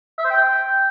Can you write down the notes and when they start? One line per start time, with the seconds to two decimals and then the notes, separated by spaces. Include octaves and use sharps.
0.18 E5
0.25 C5
0.31 G5